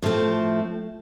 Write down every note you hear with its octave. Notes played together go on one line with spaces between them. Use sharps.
A2 F3 A3 C4